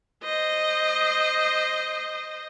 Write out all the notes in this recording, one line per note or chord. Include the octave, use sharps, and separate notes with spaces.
C5 D#5